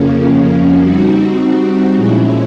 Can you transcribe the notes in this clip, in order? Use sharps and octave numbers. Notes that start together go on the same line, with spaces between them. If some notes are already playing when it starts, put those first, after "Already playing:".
Already playing: F2 C#3 F3 A#3 C#4
G3 C4 D#4 F#4
A#2 F3 G#3 C#4 E4